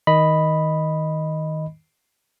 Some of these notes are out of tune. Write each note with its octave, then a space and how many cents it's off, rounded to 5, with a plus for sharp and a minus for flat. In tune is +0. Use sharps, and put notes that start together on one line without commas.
D#3 +15 D#5 +0 B5 +0